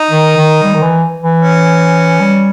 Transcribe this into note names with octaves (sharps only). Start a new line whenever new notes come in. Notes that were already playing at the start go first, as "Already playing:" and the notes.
Already playing: D#4
D#3
D#3
G3
D#3
E3
E3
C#4
G3